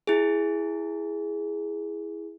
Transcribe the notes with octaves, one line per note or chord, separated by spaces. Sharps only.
E4 G#4